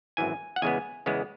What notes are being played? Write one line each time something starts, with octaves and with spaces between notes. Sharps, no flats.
G#1 F#2 E3 G#5
F#5
E2 C#3 G#3 B3 G#5
E2 C#3 G#3 B3